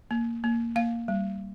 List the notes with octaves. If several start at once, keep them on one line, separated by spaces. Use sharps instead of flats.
A#3
A#3
A#3 F5
G3